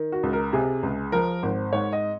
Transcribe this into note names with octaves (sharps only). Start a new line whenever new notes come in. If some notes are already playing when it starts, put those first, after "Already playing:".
Already playing: D#3
F#4
C#2
A#4
C3 G#4
C#2
F3 A#4
G#1 C5
G#2 C#5
D#5